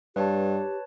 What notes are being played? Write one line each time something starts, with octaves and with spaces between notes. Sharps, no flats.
G2 G4 B4 C#5 A5